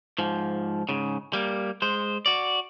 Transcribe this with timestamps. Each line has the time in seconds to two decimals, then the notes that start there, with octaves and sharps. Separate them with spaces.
0.18 G#2 F3
0.89 G#2 C#3
1.33 G3 A#3
1.82 G#3 C5
2.26 F#4 D5